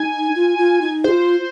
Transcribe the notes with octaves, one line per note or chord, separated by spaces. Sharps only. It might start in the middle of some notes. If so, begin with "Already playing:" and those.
Already playing: D#4 G#5
F4
F4
D#4
F4 G#4 C5